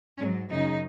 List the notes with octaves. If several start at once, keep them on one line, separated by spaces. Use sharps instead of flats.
G#2 C#4
F#3
F#2 C#3 F#3 D#4